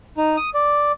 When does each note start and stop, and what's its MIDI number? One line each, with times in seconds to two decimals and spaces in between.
0.17 0.36 63
0.37 0.50 87
0.54 0.92 74